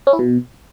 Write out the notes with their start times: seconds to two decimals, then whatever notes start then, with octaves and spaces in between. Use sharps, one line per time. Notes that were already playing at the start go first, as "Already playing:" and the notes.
0.07 C#4
0.13 E4
0.19 B2